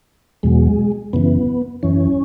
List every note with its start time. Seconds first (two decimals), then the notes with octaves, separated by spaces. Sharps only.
0.43 E2 B2 F#3 G#3
1.13 F#2 C#3 E3 B3
1.83 F#2 E3 C#4